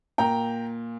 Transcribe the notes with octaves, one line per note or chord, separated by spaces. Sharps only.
A#2 G5 A#5